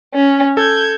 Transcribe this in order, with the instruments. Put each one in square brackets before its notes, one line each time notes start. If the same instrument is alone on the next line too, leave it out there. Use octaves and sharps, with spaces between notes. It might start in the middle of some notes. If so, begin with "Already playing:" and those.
[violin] C#4
[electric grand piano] A4 [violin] G6 G#6